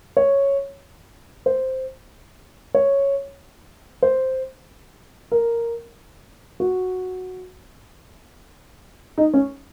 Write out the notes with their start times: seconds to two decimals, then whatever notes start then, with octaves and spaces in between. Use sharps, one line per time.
0.17 C#5
1.46 C5
2.74 C#5
4.02 C5
5.32 A#4
6.60 F#4
9.18 D#4
9.34 C#4